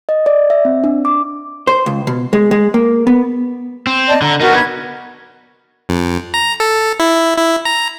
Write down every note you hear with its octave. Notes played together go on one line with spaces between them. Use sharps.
D#5
D5
E5
C4
D4
D6
C5
C#2
B2
G#3
G#3
A#3
B3
C4
D5 D#5 A5
D3 A#5
B3 D#4 F#4 A#4
B4 G#6
F2
A#5
A4
E4
E4
A#5